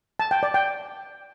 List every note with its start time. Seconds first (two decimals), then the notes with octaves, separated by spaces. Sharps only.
0.19 A5
0.31 G5
0.43 D5
0.54 G5